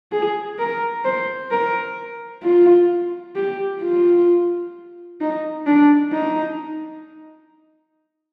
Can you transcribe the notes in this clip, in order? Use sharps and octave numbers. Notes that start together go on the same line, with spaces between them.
G#4
A#4
C5
A#4
F4
G4
F4
D#4
D4
D#4